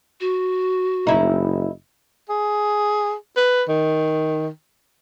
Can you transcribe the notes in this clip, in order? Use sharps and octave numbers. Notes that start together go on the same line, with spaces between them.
F#4
F#1 D#4 E4
G#4
B4
D#3